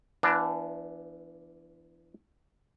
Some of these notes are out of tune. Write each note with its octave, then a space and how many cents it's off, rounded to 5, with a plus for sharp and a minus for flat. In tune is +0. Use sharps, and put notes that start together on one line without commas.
E3 +25 B3 -20 D4 +0